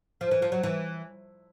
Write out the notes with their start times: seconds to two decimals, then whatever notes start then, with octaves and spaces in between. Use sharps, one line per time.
0.21 F3
0.31 E3
0.42 F3
0.52 F#3
0.63 E3